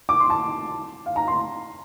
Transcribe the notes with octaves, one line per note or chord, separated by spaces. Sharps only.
D6
C6
A5
F5
A#5
C6